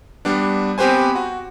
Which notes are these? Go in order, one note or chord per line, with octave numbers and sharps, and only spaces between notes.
G3 B3 D4
B3 C4 G4 B4 C5 G#5
F#4